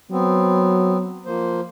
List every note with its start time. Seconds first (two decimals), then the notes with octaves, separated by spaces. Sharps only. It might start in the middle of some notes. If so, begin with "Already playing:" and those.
0.11 F#3 B3 C4
1.25 F3 A#3 C5